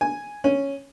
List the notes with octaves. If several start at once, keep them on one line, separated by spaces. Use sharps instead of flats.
G#5
C#4